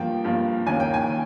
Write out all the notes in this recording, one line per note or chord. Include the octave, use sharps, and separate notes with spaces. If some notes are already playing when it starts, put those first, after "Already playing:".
Already playing: G2 F3 A#3 G5
G2 F3 A#3
D#2 D#3 A#3 C#4 G#5
G5
G#5
D#3